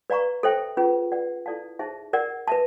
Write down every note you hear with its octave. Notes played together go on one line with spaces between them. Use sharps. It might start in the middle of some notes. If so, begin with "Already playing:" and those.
B4 D5 F5 A#5 C#6
A4 C5 E5 G5
C#4 F4 G#4 B4
B4 D5 F#5
E4 A4 D5 F5 A5
D#4 G#4 C5 E5 A5
A#4 D5 F#5
B4 E5 A5